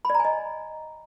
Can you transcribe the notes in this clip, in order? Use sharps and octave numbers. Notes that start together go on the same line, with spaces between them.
B5
D5
A#5
G#5
D#5